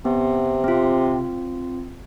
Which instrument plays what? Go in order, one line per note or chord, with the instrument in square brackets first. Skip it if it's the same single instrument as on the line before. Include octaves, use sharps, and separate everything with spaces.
[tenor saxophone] C3 [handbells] B3
[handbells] C4 F4